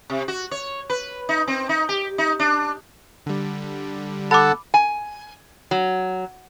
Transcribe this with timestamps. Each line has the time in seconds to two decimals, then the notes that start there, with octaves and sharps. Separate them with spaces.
0.10 C3
0.28 F#4
0.51 C#5
0.90 B4
1.29 D#4
1.48 C4
1.69 D#4
1.89 G4
2.18 D#4
2.39 D4
3.26 D3 G3
4.31 A4 F#5 A5 B5 D6
4.74 G#5
5.71 F#3